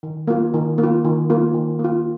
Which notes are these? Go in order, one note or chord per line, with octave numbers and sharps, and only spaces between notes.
D#3
A#3 F4
D#3
A#3
F4
D#3
A#3 F4
D#3
A#3
F4